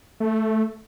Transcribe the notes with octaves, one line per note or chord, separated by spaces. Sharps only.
A3